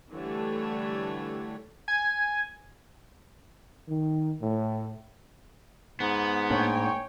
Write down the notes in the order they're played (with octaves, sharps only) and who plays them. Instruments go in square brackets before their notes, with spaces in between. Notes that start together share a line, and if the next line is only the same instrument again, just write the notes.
[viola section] D3 E3 G3 A3 A4 C#5
[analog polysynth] G#5
[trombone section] D#3
A2
[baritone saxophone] G#2 [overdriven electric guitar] B3
[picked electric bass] A2 A#3 D4 [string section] C#5 G5 G#5